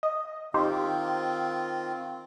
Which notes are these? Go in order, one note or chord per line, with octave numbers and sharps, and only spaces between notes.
D#5
D#3 C4 D#4 F4 G4 C5